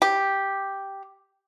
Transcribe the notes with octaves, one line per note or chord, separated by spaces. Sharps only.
G4